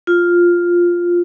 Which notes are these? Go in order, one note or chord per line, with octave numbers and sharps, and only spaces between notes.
F4